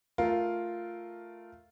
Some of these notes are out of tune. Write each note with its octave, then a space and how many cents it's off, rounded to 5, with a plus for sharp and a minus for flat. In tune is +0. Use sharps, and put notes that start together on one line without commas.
A3 +0 F4 +0 A#4 +0